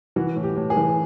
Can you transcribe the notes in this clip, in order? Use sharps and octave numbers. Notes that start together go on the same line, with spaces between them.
E3 F#4
A2
G4
A2
G#4
E3